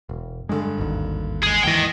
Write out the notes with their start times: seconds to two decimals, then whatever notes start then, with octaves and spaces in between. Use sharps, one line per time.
0.09 E1
0.49 G2 D3 G#3
0.78 G#1 D#2
1.43 G#3 G#4
1.64 D#2 G#2 E3 D#5 G5